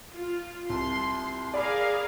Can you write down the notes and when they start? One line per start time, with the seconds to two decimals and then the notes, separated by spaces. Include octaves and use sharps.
0.15 F4
0.70 C2 A5 C6
1.54 G#4 A#4 D5 F5 B5 D6